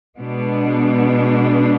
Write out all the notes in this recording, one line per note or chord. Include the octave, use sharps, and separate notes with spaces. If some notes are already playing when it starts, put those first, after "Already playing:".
B2 G#3 B3 D4